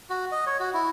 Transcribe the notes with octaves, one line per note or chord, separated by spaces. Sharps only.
F#4
D#5
C#5
F#4
E4